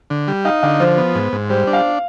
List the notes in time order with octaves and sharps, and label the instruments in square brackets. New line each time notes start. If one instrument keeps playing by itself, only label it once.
[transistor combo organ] D3
G3
[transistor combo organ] D#4 [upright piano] F5
[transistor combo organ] D3 [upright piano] F5
[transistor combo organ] F3 [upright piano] C5
[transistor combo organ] B3
G#2
G#2
[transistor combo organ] G3 [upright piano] C5
[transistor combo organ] D4
[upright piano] F5